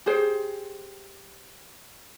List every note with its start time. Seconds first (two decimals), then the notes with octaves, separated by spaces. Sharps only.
0.06 G4 G#4 C5